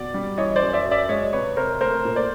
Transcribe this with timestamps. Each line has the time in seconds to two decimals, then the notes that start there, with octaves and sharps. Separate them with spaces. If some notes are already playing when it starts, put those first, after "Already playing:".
Already playing: B2 D5
0.14 G3
0.38 E3 C#5 D#5
0.56 C5 D5
0.62 F#2
0.73 D5 E5
0.85 F#2
0.91 D5 E5
1.09 G#3 C#5 D#5
1.33 C3 B4 C#5
1.57 C3 A#4 C5
1.81 A3 A#4 C5
2.05 A#2
2.16 C5 D5